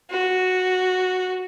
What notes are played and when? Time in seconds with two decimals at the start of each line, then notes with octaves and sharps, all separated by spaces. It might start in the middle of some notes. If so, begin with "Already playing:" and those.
0.10 F#4